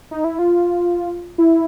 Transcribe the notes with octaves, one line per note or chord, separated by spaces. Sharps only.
D#4
E4
F4
E4